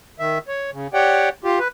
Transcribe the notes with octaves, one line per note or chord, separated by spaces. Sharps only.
D#3 E5
C#5
C#3
G4 C#5 D5 F#5 G5
F4 G4
B4